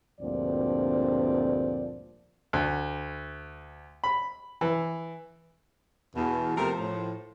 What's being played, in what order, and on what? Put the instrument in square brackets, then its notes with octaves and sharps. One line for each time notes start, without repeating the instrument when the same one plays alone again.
[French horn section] D2 G2 A#2 F3 C4 D5
[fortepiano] D2
B5
E3
[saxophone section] E2 [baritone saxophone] B2
[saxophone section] C3 A3 A#4 [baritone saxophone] F3
[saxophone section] A2